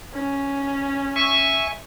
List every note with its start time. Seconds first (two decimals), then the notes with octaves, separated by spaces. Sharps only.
0.14 C#4
1.16 E5 G#5 C#6